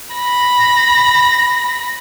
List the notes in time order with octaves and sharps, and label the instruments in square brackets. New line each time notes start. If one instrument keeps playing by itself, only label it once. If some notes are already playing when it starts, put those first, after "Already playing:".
[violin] B5 A#6